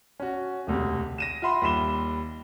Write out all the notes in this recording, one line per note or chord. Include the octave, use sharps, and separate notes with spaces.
C#4 F#4
E1 D2 C3
A#6 D#7 E7
F4 E5 F#5 B5 C6
D#2 G3 B5 E7 G7